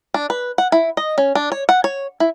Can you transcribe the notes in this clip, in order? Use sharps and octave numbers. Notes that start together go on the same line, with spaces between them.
D4
B4
F#5
E4
D#5
C#4
D4
C#5
F#5
C#5
E4